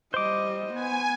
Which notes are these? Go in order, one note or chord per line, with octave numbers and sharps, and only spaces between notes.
G3 C5 D#5 D6
B3 G#5